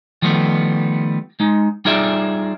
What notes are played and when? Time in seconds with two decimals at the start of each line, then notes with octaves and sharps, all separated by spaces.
0.22 D#3 F3 G3 A3 B3
1.40 G#3 D#4
1.85 G3 D#4 F4 G#4 D5 E5